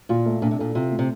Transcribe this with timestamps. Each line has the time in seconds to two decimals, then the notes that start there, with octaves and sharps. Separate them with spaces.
0.09 A#2 F4
0.26 A3
0.42 A#2 D4
0.51 C3
0.59 A#2 A4
0.75 C3 F4
0.91 A3
0.99 C3